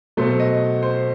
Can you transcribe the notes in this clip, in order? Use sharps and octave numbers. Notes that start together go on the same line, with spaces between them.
B2 F#3 A3 C5
D#5
C5